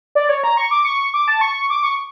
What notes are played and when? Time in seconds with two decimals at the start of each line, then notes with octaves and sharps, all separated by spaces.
0.15 D5
0.29 C#5
0.44 A#5
0.57 C#6
0.71 D6
0.85 C#6
1.14 D6
1.28 A5
1.41 C#6
1.70 D6
1.83 C#6